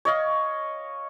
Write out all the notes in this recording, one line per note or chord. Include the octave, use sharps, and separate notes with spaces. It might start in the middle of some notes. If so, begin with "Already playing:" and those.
C#5 D#5 F5